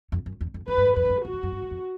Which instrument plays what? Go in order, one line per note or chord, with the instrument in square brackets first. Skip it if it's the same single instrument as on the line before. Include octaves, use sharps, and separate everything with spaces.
[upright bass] F2
F#2
E2
F2
[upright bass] F#2 [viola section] B4
[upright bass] G2
F#2
[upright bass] F2 [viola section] B4
[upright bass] G2
F#2
[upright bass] E2 [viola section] F#4
[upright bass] F2
F#2
G2
F#2
F2